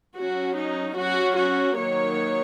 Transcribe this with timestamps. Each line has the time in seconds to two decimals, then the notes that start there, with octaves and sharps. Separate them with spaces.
0.17 F#3 C#4 F#4
0.58 D#4
0.97 F#3 C#4 F#4
1.37 F#4
1.77 D#3 F#3 A#3 C#5